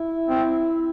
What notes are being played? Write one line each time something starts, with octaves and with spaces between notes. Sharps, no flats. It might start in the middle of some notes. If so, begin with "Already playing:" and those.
Already playing: E4
C4